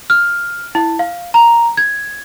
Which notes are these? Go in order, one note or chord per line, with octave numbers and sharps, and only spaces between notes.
F6
E4
F5
A#5
G#6